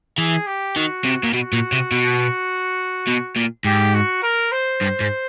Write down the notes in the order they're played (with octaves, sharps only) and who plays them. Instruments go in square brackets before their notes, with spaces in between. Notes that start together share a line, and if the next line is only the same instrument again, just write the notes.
[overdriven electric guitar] E3 [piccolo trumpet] G#4
[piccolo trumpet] G4
[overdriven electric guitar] D#3 [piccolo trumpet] F#4
[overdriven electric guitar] C3
A#2
[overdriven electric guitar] B2 [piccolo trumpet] F#4
[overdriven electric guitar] A#2
C3
B2
B2
A#2
[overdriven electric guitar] G#2 [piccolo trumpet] G4
[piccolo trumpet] F#4
A#4
C5
[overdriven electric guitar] G2
G#2